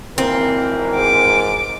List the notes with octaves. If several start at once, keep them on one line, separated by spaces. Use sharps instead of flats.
G#1 E3 A#3 C4 A#4
G#2 D6